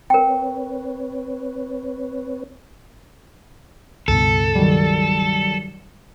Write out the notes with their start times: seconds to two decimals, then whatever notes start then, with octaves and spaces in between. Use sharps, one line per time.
0.10 C4 A#4 B4 C#5 G5
4.08 C#2 G2 B2 A4
4.55 D#3 F#3 G3